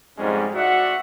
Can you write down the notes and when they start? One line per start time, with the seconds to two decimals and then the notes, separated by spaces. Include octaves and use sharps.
0.18 F2 G#2 G3 G#3 C#4
0.54 F#4 D5 E5 F#5